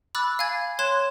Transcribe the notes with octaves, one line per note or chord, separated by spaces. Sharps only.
B5 D6 E6 F#6 A6
F5 G#5 G#6 A6
C#5 C6 F#6 G#6 E7